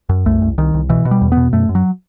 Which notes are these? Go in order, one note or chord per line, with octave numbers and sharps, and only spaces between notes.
F#2
C2 A3
C2
C2 D#3
C2
B2 E3
B2
G3
E2
B3
B2
F#2 A3
F#2
F#3